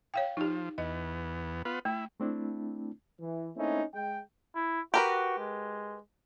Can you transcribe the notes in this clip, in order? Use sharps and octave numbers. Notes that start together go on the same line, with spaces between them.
C#5 F5 G5
F3 D#4 G4
E2 B3 D#5
B3 F4 B4
A3 E4
A3 C4 D4 E4
E3
A3 A#3 C4 C#4 D#4 E4
G#3 G5
E4
F#4 G4 A#4 B4
G#3